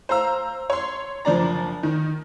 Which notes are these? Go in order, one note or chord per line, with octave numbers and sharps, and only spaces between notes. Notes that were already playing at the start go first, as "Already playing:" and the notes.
C5 F5 A#5 E6
C#5 C6
F#1 F3 D4 D5 A#5
D#3